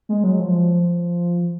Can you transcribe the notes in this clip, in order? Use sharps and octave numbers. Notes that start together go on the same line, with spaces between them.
G#3
F#3
F3